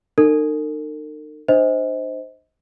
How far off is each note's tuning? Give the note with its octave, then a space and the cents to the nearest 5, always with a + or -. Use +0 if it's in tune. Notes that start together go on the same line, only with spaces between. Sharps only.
D#4 -35 A#4 -45
D4 +35 C5 -5 D#5 +30